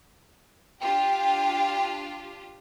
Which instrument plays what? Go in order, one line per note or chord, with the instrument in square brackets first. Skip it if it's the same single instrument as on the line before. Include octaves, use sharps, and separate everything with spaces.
[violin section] D4 F4 G4 [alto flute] G5